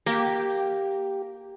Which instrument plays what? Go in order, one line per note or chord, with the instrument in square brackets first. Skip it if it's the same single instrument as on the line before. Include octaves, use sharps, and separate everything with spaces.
[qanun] A#3 [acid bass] G4